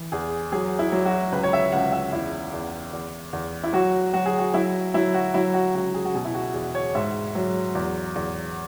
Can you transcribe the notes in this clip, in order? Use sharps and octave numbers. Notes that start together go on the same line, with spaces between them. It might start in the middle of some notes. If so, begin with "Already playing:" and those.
Already playing: E3
E2 G#4
F#3 G#4
E4
F#3
F#4
C#2 B4
C#5
E5
C#2 F#5
E5
E2 E4
E2
E2
E2
E4
F#3 F#4
F#3 F#4
G#4
F#4
F#3 E4
F#3 E4
F#4
F#3 E4
F#4
C#2 F#4
G#4
F#4
B2 G#4
E4
F#4
E2 G#4
C#5
G#2 E5
F#3
E2
E2